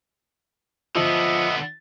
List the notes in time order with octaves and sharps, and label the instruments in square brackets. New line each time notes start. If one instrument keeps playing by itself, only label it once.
[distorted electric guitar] D3 B3 [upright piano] F3 [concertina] D#5 E5